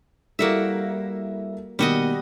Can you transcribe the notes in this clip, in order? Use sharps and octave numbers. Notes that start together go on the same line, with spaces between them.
G3 A#3 E4 F#4 A4 E5
B2 D#3 G3 A#3 F#4 D#5